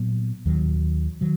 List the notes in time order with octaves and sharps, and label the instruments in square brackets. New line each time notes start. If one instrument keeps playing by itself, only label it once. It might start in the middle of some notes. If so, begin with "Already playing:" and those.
Already playing: [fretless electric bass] A#2 F#3 B3
D#2 D#3 F#3
D#3 F#3